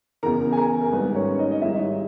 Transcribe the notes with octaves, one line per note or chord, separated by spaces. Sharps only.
E2 C#3 E3 A#4 A#5
G#5
A#4 A#5
A#4
G#1 G#2 G3 B4
C#4 C#5
C#5
D#4 D#5
D#5
G#1 G#2 G3 E4 E5